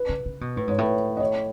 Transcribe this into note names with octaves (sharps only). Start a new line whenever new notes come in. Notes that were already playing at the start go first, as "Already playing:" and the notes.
Already playing: B4
C#3
C#3
B2
A2 B4
G#2 C#5
A2 B4
D#5
C#5